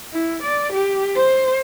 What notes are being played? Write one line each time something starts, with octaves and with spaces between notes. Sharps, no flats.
E4
D5
G4
C5